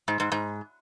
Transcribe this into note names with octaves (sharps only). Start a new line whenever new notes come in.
G#2
G#2
G#2